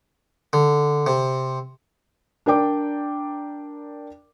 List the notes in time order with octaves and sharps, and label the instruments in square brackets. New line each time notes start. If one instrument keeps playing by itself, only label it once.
[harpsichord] D3
C3
[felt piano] D4 A#4 D5 G5 D6